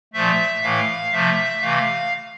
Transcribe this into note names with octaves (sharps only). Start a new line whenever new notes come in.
A#2 F3 A3 E5
A2 E3 A3 F5
C3 F3 A3 E5
C3 E3 A3 F5